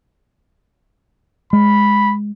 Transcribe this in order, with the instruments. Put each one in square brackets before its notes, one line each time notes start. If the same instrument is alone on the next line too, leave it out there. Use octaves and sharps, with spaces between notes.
[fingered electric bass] G#3 [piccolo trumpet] B5